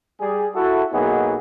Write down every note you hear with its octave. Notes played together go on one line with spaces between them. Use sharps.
G3 G#4
E4 F#4 A4
B1 F#3 A#3 B3 D#4 G#4